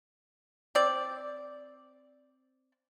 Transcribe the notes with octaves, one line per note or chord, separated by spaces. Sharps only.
C4 D5